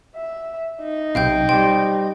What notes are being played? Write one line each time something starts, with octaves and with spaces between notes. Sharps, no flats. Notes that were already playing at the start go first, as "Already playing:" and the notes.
E5
D#4
B1 C3 F5 G5 G6
G3 G4 C5 G5